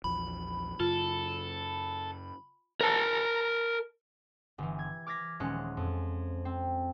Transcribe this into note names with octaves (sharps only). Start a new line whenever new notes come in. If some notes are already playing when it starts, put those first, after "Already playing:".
A#1 E2 F3 B5
F#2 C#3 F4 A4
A#4 A5
G1 E3
G#6
D6 F6 G#6 A#6 B6
D#1 F3 G#3 C#4 F#6
F2
C4